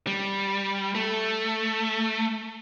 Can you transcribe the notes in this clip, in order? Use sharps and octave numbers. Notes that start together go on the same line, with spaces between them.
G3
A3